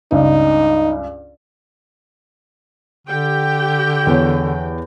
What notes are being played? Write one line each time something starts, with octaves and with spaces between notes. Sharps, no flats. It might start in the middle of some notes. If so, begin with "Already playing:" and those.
C#2 G2 D#4
D3 G4 G5
E2 C#5